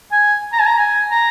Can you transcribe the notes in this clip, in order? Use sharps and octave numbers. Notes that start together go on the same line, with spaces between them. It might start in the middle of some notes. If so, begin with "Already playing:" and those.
G#5
A#5
G#5
A#5
G#5
A#5